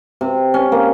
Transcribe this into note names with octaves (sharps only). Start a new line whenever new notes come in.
C3
C#4
A#3